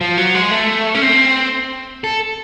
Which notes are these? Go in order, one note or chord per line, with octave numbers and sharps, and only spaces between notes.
F3
F#3
G#3
A3
C#4
C4
A4